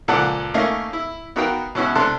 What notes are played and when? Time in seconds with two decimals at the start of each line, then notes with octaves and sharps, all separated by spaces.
0.08 C#2 A#2 F3 A4 D5 F#5
0.54 A3 A#3 C#4 D#4 D#5 F5
0.93 E4
1.36 B3 D#4 F#4 A#4 F5 G5
1.75 B2 C#4 E4 F#4
1.95 C3 D4 A4 C6 F#6